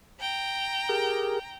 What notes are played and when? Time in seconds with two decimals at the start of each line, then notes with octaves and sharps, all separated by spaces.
0.20 G5 A#5
0.89 G4 G#4 A#4